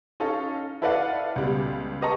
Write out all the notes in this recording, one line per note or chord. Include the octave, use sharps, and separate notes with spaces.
C#4 D#4 A4 F5
E4 A4 B4 D5 F5 F#5
C#2 G3 B3
G4 B4 D#5 A5 A#5 C#6